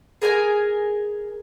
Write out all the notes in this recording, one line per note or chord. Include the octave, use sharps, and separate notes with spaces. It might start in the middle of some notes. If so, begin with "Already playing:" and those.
G#4 A#4 D#5 G#5